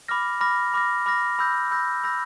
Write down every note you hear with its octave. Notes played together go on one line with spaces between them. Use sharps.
B5 D6 F6 A#6
B5 D6 F6 A#6
B5 D6 F6 A#6
B5 D6 F6 A#6
B5 E6 G6 A#6
B5 E6 G6 A#6
B5 E6 G6 A#6